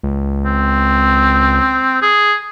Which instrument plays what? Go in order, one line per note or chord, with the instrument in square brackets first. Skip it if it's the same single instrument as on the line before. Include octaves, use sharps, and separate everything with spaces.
[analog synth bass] C#2
[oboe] C4
G#4